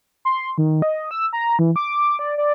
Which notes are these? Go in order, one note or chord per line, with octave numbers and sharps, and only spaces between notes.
C6
D#3
D#5
E6
A#5
E3
D6
D5
D5